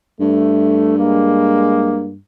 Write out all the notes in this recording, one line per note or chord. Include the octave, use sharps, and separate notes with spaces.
G2 A3
G#3 A#3